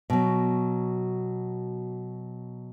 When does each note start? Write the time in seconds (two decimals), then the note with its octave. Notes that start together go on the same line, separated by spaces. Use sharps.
0.10 B2 F#3